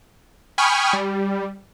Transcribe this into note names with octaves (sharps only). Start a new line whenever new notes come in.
G5 G#5 B5 C#6 D#6 F6
G3